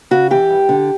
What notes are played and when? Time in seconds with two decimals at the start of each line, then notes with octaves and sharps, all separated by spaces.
0.11 C#3 F#4
0.31 E3 G4
0.50 G2
0.69 D3